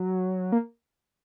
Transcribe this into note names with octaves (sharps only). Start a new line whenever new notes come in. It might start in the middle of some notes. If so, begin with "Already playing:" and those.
Already playing: F#3
A#3